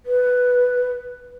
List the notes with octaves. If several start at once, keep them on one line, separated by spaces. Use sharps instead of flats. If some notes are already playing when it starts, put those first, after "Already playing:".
B4